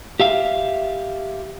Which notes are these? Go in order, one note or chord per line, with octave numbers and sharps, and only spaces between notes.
G4 E5 F5